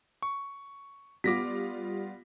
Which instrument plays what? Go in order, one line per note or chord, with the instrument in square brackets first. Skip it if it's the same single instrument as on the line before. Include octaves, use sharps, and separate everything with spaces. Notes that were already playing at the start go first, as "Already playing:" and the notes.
[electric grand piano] C#6
[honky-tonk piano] G3 B3 F4 [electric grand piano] D6 A#6 B6